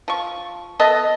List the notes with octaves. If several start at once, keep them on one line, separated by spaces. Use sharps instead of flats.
F3 C#6
B3 A4 D#5 E5